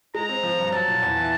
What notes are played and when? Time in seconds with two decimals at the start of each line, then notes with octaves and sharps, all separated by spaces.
0.15 G#3 A#5
0.29 C4
0.43 F3
0.59 G2
0.72 F#3 A5
0.88 A#2
1.02 E2
1.17 E3